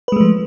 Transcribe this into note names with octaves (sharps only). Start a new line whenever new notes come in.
F3 G#3 A3 B4